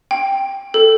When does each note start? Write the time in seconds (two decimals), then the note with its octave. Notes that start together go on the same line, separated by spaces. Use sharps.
0.11 G5
0.74 A4